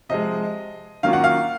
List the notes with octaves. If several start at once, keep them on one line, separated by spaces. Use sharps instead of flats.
C3 F3 G#3 D#5
D#3 F#3 A#3 C#4 F4 F5
F#5
F5